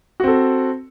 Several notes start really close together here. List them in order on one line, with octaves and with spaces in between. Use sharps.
F#4 C4 A4